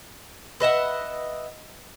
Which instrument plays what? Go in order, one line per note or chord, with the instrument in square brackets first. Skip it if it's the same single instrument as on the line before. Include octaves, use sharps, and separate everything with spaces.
[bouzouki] B4 D#5 E5 F#5